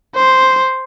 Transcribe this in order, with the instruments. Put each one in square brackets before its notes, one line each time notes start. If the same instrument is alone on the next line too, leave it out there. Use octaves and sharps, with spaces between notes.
[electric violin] C5